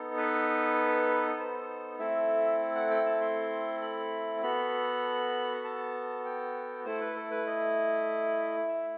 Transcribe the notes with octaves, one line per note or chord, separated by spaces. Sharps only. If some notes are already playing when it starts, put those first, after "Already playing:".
Already playing: B3 D#4 A4
B4
C5
A3 C4 E4 A4 E5
F#5
G5
A5
C6
B5
B3 F#4 A4 B5
A5
G5
A3 E4 A4 C5
B4
A4
B4
D#5
E5